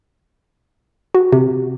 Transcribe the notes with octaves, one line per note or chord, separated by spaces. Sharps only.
F#4
C3